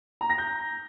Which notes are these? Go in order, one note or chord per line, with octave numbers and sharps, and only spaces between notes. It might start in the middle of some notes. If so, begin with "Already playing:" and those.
A#5
A#6
G6